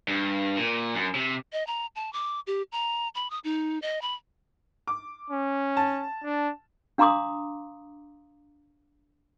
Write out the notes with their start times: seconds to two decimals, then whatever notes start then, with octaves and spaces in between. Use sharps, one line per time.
0.08 G2
0.57 A#2
0.95 F#2
1.15 C3
1.53 D#5
1.67 A#5
1.96 A5
2.13 D6
2.47 G4
2.72 A#5
3.15 B5
3.30 D#6
3.44 D#4
3.82 D#5
4.02 B5
4.87 D6
5.31 C#4
5.77 A5
6.24 D4
6.98 D4 F5 A#5 C6 D6 D#6